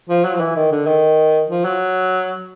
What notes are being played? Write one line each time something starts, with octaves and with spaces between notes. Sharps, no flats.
F3
F#3
F3
E3
D#3
D3
D#3
F3
F#3